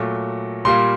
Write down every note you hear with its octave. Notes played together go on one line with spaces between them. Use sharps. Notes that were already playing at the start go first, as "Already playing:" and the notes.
Already playing: A#2 F#3 A3
A#2 G3 A#3 C6